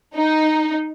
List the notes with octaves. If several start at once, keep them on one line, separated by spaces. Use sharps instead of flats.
D#4